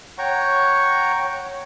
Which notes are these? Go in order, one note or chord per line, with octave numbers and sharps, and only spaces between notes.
C#5 F#5 G5 A#5 C#6